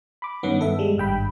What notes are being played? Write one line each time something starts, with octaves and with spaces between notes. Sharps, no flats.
B5 D6
G2 D#3 B3 C#4
G2 A4 E5
G3 G#3
G#1 G2 G5 B5